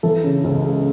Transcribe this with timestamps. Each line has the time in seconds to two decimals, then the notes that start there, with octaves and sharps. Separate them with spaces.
0.03 E3 A4
0.24 C#3
0.44 C#2
0.65 G#3